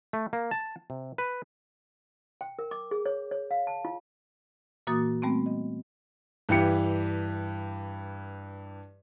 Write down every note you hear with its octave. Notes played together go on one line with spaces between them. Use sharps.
A3
A#3
A5
C3
B4
G5
A#4
D6
G#4
C#5
C#5
F5
A5
F4
A#2 E3 A#3 F#4 D#6 A6
G3 A3 B3 C4
D#5
G2 E3 G4 C#7